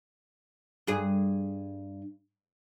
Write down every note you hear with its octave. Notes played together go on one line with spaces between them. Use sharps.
G2 G#4